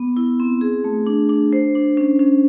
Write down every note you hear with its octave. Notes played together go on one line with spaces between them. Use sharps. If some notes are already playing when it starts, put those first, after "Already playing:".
Already playing: B3
E4
C4
G#4
A3
D4
D4
C5
D4
C#4
C#4